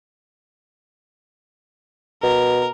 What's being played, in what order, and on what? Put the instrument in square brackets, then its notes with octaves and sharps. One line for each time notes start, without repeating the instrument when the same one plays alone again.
[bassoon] B2 [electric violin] A#4